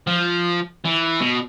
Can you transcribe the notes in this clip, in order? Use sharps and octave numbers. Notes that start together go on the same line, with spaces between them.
F3
E3
B2